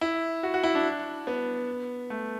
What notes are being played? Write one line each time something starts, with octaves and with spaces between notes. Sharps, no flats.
E4
F#4
F#4
E4
D4
B3
A3